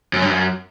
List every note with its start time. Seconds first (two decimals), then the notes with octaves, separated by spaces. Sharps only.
0.13 F#2
0.22 G2
0.29 F#2